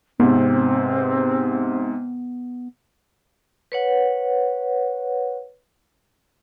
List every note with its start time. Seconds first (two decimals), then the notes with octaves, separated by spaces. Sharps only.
0.20 G#2 C3 B3 C4
3.72 B4 C#5 F#5